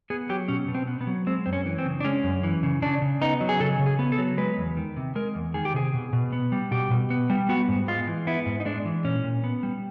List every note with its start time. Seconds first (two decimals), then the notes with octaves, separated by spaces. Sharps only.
0.10 B3 G#4
0.29 F#3 G4
0.48 B2 C#4
0.68 B2
0.75 C4
0.87 B3
1.01 B3
1.07 F#3
1.27 G#3 C4
1.46 F#2 C4
1.53 C#4
1.66 E3
1.78 C4
1.85 C#3
2.00 D4
2.05 G#3 C#4
2.24 F#2
2.43 E3
2.63 C#3
2.82 C#3 D4
3.02 C#3
3.21 B3 D#4
3.41 F#3
3.49 G#4
3.60 C#3 A4
3.79 C#3
3.86 G#4
3.99 B3
4.12 A4
4.18 F#3
4.38 G#3 B4
4.58 E2
4.77 D#3
4.97 C3
5.15 G#3 A#4
5.35 E2
5.54 D#3 G#4
5.65 G4
5.74 C3 G#4
5.94 B2
6.13 B2
6.33 B3
6.52 G3
6.71 B2 G4
6.91 B2
7.10 B3
7.30 G3
7.49 B3 F#4
7.68 G#2
7.88 G#3 F4
8.08 E3
8.27 B3 E4
8.46 G#2
8.60 D#4
8.65 G#3 D4
8.85 E3
9.05 A#2 C#4
9.24 A#2
9.44 B3
9.63 G3